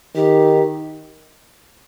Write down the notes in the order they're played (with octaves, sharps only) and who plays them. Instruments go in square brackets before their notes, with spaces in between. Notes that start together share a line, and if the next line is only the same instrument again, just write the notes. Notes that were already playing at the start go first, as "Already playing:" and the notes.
[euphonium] D#3 [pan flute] G4